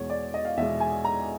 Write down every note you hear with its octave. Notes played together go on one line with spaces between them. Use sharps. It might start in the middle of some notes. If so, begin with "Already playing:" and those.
Already playing: E2 B2 G#3 C#5
D5
D#5
F5
E2 B2 G#3 E5
G#5
A#5